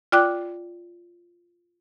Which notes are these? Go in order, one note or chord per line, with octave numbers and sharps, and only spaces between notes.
F4 D5 G5 D6 F#6